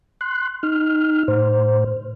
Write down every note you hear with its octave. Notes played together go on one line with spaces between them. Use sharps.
C6 F#6
D#4 F6
A2 C5